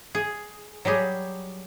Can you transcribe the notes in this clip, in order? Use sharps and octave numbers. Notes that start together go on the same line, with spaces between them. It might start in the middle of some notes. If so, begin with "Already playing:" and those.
G#4
F#3 G3 G4 G#4